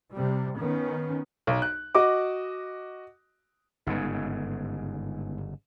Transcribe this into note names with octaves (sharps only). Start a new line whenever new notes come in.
C3 G3
D#3 B3 C#4
B1
F#6
F#4 D#5 D6
G1 G#2 C#3 G#3 B3 D#4